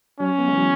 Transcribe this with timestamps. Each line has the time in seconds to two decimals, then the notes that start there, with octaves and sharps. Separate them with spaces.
0.20 F#3 C#4
0.38 B3
0.48 G#3
0.53 E3
0.57 F#3